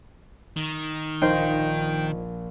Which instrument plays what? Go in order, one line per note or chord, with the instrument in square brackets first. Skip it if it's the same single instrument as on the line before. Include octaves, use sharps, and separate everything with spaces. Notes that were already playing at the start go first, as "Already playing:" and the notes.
[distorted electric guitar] D#3
[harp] A#1 [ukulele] D#4 C5 [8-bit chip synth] G5